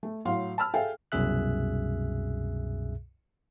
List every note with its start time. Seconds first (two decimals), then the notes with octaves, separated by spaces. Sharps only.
0.03 A3
0.25 A2 F#3 F5 C6
0.58 A5 B5 E6 F6
0.74 G#4 A4 E5 F5 G5 G#5
1.12 C2 F#2 B2 G#4 E5 F#6